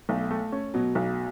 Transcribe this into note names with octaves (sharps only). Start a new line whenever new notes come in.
B1 A3
A3
C#4
B2 F#3
B1